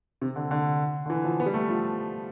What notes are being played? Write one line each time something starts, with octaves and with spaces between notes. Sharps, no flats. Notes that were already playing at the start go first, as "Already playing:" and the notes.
C3
D3
D3
D3
E3
F3
B3
G3
A3
F3